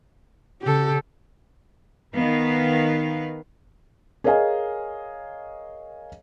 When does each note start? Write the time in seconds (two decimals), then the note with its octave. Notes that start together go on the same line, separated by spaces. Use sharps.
0.62 C#3 G4 A4
2.16 D#3 B3 B4 F5
4.24 G#4 A#4 C#5 D#5 F5 G#5